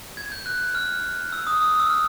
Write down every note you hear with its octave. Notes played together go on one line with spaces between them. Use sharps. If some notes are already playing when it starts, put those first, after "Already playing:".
G#6
G6
F#6
F6
E6
D#6
D#6
D#6
E6
F6